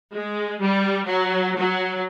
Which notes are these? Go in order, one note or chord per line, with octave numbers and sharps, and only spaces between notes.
G#3
G3
F#3
F#3